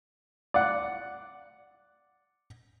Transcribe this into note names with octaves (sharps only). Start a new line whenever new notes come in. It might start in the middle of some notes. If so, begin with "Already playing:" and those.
D5 F#5